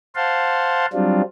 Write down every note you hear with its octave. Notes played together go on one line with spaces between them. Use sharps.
C5 F5 F#5 A5 C6
F#3 G3 C4 D4 F4